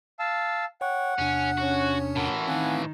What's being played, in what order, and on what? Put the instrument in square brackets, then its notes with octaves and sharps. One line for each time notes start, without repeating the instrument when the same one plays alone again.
[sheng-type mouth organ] F5 A5 E6
[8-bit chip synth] C#5 G5 C#6 [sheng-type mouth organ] F#5
[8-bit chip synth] E2 C3 D4 [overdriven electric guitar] C#4
[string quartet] C#4 [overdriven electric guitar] F#4
[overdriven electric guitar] A2 E3 [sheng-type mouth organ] F#4 A#4
[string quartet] D#3 [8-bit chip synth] C4 F5 [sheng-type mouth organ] F#5 G#5